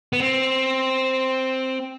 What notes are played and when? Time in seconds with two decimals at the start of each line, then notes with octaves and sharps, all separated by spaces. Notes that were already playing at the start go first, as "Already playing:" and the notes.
0.13 B3
0.20 C4